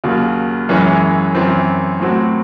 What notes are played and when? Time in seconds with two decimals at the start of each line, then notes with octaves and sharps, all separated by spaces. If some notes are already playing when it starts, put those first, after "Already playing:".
0.04 D#2 C#3 F#3
0.69 F#2 E3 G#3 C#4 E4
1.35 F#2 E3 C4
2.00 A2 F#3 C4 F#4